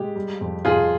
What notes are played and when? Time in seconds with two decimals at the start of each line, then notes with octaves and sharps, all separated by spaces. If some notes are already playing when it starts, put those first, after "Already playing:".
Already playing: G#3 G4
0.15 G3
0.41 F2
0.65 F2 F4 G#4